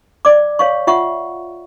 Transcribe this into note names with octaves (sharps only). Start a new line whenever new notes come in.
D5 D6
C#5 F5 C#6
F4 E5 F#5 C#6